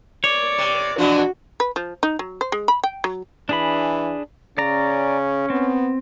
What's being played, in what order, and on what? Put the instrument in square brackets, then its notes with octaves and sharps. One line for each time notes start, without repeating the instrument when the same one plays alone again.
[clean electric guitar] C#5 [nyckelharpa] D5
[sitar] C3
[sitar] B2 E3 F3 [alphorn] D4 [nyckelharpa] F#4
[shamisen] B4
F3
D#4
F#3
C5
G#3
B5
G5
F#3
[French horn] E3 [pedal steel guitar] D4 G#4 B5
[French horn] C#3 [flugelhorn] C#4 [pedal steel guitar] D5 A#5
[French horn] B3 [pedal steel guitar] C4